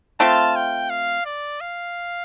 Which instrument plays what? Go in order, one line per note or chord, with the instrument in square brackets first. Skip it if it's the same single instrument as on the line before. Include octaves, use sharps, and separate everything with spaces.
[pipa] A3 C4 F4 [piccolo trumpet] A5
[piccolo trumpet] G5
F5
D5
F5